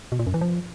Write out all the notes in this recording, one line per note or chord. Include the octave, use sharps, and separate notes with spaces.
B2
A#2
F#2
E3
F3